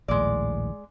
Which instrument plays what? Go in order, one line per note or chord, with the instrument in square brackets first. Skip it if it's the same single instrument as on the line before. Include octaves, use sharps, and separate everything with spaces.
[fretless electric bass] A#1 D#2 A2 [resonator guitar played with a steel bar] G#3 D5